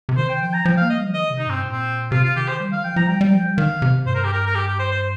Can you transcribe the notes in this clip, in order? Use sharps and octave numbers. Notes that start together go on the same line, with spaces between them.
C3
D#3 C5
G5
F3 G5
A#5
F3 G5
F5
A#3
D#5
G3
F3
D#3 D#5
C3
D#4
G2 C4
A#2
C4
C3 F4
F4
D#3 G4
C5
G3
D#3 F5
F3 G5
F3 A#5
G3 G5
G3
F3
G3
D#3 F5
C3
G2 C5
A#4
G4
A#4
A#4
G4
G4
C5
C5